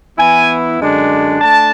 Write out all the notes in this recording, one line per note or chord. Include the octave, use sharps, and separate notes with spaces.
E3 B3 E4 G#5
F#2 D3 G#3 D4
A3 D4 A5